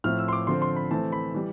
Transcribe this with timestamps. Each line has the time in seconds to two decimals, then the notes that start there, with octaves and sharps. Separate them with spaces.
0.04 A2 F3 C4 F6
0.18 E6
0.28 C6
0.33 D6
0.47 D3 F3 C4 C6
0.62 C6
0.76 B5
0.90 E3 A3 C4 A5
1.12 B5
1.34 E3 G3